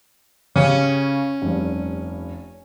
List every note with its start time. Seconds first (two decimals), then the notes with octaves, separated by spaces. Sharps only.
0.56 C#3 C#4 G4
1.42 F1 G2